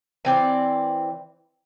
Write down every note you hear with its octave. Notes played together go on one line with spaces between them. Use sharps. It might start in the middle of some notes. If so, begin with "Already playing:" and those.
E3 C4 D5